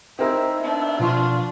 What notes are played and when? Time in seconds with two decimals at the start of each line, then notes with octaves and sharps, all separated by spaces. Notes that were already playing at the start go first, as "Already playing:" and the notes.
0.19 C4 D#4 A#4 E5
0.60 B3 D4
1.00 B2 F3 F4 C#6